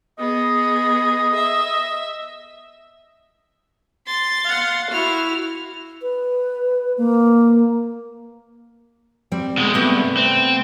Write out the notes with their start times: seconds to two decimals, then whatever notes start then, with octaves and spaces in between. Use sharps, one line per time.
0.19 B3 G#4 D#5
1.35 E5
4.06 C6 A6
4.45 F5 F#5
4.91 E4 F#4 F6
6.02 B4
6.98 A#3
9.32 G3 C4
9.58 B2 G#3
9.74 G2 C3 A3 B3
10.17 C4